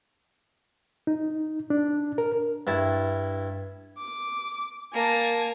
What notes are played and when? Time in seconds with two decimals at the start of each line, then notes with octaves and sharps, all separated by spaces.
1.07 D#4
1.70 D4
2.18 A#4
2.67 G2 E4 A5
3.99 D6
4.94 A#3 G#5 A5